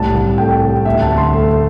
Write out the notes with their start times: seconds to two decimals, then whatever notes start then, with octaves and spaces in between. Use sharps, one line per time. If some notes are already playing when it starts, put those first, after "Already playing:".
Already playing: C2 A2 A5
0.14 C2
0.38 A3 G5
0.62 C3
0.85 D2 E5
1.02 A5
1.09 D2
1.18 C6
1.33 A3